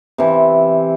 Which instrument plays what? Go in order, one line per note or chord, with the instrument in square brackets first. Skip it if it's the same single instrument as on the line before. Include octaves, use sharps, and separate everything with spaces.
[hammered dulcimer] C3 E3